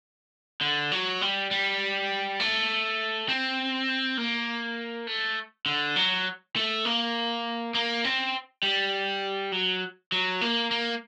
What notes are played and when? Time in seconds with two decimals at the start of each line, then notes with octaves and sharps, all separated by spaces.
0.61 D3
0.92 F#3
1.21 G3
1.51 G3
2.40 A3
3.29 C4
4.17 A#3
5.07 A3
5.66 D3
5.96 F#3
6.56 A3
6.85 A#3
7.74 A#3
8.04 C4
8.63 G3
9.52 F#3
10.12 F#3
10.41 A#3
10.71 A#3